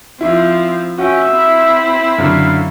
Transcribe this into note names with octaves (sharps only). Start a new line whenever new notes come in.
F3 C4 E4
C#4 F#4 E5 G5
C4 E4
F#2 D3 F5